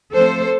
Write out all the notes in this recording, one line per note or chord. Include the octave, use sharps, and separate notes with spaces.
F3 A3 C4 A4 C5